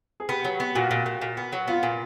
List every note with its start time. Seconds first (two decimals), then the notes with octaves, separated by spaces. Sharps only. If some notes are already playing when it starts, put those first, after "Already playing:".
0.20 G#4
0.29 B3 G4
0.44 F#3
0.60 B3
0.75 A#2 F#4
0.91 A#2
1.06 A#2
1.22 A#2
1.37 B3
1.53 F#3
1.68 B3 F4
1.83 A#2